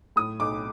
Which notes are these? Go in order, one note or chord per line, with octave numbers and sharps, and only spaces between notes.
A2 D#6
B1 D6